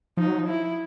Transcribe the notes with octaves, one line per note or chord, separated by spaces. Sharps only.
F3 D#4
F#3
F3
E4